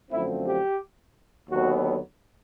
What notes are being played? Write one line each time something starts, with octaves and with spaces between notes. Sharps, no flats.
F#2 D3 F3 A3 C4 E4
G4
D#2 D3 F#3 B3 F#4